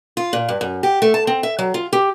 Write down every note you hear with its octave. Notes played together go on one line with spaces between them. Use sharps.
F4
A#2
G2
F#2
G4
A3
A5
C4
E5
F#3
F4
G4